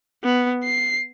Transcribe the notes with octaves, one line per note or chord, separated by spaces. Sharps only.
B3
C7